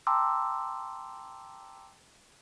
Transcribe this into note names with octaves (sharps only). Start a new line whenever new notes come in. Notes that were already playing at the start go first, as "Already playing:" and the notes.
G5 A5 A#5 C6 D6 E6